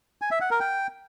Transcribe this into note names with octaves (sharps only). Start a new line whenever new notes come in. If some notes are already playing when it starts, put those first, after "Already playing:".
G#5
E5
F#5
A#4
G5